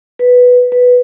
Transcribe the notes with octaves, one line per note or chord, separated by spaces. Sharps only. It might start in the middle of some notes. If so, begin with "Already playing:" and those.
B4
B4